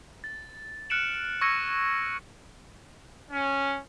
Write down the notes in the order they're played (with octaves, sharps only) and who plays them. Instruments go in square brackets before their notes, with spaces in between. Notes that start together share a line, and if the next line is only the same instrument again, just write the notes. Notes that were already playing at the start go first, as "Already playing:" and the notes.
[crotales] A6
F6 F#6 C#7 D7 E7 F#7
C#6 E6 G#6 A#6 C#7 D#7
[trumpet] C#4